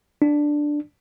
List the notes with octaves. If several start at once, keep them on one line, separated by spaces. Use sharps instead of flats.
D4